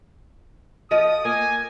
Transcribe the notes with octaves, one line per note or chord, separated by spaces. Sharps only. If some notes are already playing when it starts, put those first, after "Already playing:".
F3 D#5 D#6
A#3 G#5